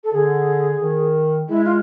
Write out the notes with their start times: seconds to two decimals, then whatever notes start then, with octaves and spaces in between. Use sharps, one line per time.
0.04 A4
0.12 D3 G#4
0.80 D#3
1.49 G#3 E4
1.64 F4